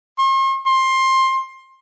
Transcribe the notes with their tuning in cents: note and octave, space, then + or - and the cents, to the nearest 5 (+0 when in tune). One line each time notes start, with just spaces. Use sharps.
C6 +45
C6 +20